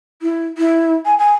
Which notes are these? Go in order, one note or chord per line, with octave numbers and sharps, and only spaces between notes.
E4
E4
G#5
G#5